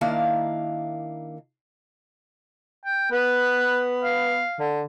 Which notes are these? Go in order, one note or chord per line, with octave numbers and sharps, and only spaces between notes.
D#3 A#3 D4 E4 F5
G5
B3 B4
F5
D3